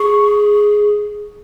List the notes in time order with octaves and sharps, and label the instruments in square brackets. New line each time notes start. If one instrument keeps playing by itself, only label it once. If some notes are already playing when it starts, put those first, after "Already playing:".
Already playing: [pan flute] G#4 [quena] C#6